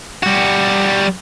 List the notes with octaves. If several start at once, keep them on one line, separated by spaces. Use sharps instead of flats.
G3 F#4